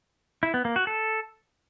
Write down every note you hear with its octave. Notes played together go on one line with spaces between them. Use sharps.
E4
B3
A#3
F#4
A4